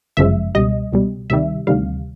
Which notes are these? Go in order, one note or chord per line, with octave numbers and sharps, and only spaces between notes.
G1 F#2 C#3 F3 G#3 E5
C#2 B2 G3 D#5
C#2 B2 G3
D2 C3 D#3 G3 E5
D2 C3 D#3 G3 F5